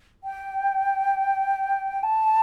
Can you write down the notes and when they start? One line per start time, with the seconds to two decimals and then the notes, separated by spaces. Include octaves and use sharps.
0.24 G5
2.03 A5